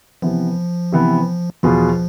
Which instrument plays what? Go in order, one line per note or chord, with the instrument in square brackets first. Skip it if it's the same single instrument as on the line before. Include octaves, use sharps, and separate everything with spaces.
[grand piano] C3 E3 B3 [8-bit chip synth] F3
[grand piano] C3 E3 B3
[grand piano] E2 B2 B3 F4 G#4 [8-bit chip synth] F3